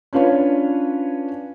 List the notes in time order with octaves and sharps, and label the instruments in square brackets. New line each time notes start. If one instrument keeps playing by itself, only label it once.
[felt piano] C#4 D4 F4 B4 C#5